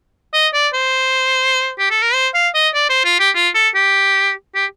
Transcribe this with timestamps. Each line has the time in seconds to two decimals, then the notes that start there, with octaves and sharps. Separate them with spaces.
0.34 D#5
0.54 D5
0.74 C5
1.79 G4
1.91 A4
2.02 A#4
2.14 C5
2.34 F5
2.55 D#5
2.75 D5
2.90 C5
3.05 F4
3.20 G4
3.35 F4
3.55 A4
3.75 G4
4.55 G4